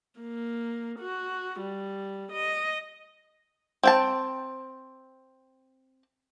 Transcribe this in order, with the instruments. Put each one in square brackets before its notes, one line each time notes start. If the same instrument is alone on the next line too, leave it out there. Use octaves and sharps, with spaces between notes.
[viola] A#3
F#4
G3
D#5
[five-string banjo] C4 G5 A5